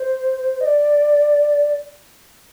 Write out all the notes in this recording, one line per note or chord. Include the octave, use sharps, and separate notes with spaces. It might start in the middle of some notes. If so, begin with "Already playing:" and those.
Already playing: C5
D#5
D5